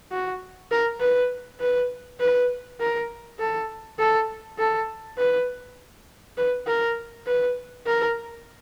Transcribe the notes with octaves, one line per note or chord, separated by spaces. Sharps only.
F#4
A#4
B4
B4
B4
A#4
A4
A4
A4
B4
B4
A#4
B4
A#4